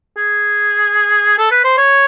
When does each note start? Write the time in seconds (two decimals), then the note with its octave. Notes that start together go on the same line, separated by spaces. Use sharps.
0.17 G#4
1.38 A4
1.51 B4
1.64 C5
1.78 C#5